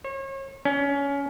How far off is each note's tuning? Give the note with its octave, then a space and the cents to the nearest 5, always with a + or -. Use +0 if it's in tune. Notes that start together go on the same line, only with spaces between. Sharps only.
C#5 -35
C#4 +20